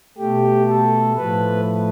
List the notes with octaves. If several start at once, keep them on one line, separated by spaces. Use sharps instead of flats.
B2 A3 G4
A4
A2 F3 A3 B4